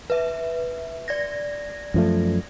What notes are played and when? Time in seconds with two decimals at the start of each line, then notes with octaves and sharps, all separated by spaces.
0.10 B4 E5
1.08 D5 G#6 A#6
1.94 F#2 F3 A3